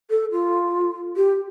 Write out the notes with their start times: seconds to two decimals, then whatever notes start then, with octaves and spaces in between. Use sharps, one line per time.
0.10 A4
0.32 F4
1.17 G4